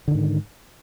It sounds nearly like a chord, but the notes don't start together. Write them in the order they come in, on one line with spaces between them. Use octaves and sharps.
D3 D#3 G#2